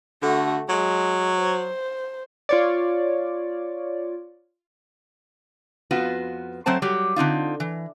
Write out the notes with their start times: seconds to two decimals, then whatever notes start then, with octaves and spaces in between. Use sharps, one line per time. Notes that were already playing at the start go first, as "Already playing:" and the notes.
0.22 D3 A3 F#4
0.69 F#3 G#3
1.39 C5
2.49 F4 C#5 D5
5.91 F2 B3 F4 F#4 B4
6.66 F#3 A3 C4 C5 A5
6.82 F#3 G3 G4
7.16 D3 C4 D#4 F4
7.60 E3